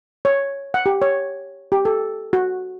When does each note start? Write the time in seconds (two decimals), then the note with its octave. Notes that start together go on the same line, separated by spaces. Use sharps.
0.25 C#5
0.74 F#5
0.86 G4
1.02 C#5
1.72 G4
1.85 A4
2.33 F#4